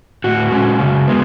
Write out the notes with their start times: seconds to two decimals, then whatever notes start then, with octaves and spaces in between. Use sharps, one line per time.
0.24 A2 F#4
0.52 G#3 C#4
0.80 C#3
1.07 G#3 B3